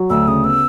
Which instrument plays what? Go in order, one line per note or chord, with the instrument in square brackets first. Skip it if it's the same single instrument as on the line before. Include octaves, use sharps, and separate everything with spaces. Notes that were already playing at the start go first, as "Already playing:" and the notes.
Already playing: [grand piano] F#3
[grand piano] D2 [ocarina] E6
[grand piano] C#3 [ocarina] D#6
[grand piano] B3 [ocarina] E6